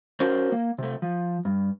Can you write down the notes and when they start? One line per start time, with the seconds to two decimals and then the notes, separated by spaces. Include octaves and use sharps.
0.20 C#4 F#4 A#4 C5
0.52 A#3
0.78 C3 A3
1.02 F3
1.45 G2